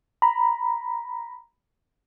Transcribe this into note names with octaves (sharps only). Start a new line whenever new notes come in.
A#5 B5